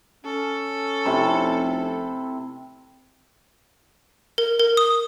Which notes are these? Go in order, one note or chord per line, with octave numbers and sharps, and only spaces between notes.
C#4 A4
F1 C3 E4 B5
A#4
A#4
D#6